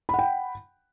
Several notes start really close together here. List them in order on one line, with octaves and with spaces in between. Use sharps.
B5 F#5 G5